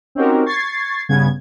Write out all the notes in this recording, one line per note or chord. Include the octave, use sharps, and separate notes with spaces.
C4 C#4 D#4 F#4 G4 A#4
C#6 G#6 A6 C7
G2 C#3 B3 G#6